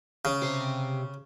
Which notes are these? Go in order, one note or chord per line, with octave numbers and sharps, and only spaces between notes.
C#3
C3 C5